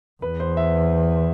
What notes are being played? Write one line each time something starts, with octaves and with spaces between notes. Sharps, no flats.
E2 B4
C5
E5